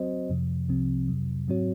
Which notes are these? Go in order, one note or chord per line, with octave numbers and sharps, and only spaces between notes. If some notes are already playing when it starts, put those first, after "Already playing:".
Already playing: F#3 C4 F#4 C5 D#5
F2 C3 F3
C2 C3 F3 C4
F2 C3 F#3
G#2 F#3 C4 F#4 C#5